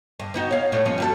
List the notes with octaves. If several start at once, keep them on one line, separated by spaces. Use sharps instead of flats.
G2
B3 D#4 F#4
C#5 F5
A2 G3 A3
G2 F3 C#4
G3 F#4 A4